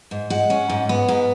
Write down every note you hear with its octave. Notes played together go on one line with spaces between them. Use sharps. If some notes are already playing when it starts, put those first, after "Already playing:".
G#2
G#3 F#5
C#4
G#2
B3
G#2